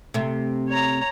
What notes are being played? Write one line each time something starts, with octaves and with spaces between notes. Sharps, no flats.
C3 A3
C#5 A#5